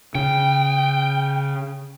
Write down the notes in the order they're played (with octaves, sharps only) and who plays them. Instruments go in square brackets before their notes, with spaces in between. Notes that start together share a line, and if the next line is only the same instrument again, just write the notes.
[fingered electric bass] C#3 [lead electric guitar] G5